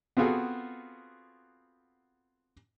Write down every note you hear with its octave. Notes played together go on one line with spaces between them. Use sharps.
B3 C4 F4 F#4 G#4 A4